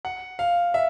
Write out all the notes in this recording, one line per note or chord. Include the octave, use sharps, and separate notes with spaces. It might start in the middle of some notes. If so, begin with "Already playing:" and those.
F#5
F5
E5